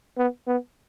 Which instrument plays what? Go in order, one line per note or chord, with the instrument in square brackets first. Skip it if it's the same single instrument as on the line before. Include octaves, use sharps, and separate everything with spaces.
[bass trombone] B3
B3